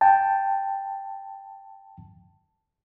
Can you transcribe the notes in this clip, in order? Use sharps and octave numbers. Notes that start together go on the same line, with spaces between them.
G5 A5